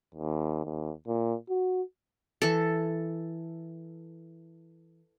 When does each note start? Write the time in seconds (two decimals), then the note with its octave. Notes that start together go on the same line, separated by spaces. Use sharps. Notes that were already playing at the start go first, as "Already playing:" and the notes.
0.15 D#2
0.65 D#2
1.07 A#2
1.50 F#4
2.42 E3 A4